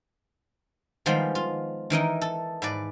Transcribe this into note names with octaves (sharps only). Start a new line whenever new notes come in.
D#3 F3 G3 G#3 B3 F4
F4
D#3 E3 D#4 A#4
A4
G#2 B4 D5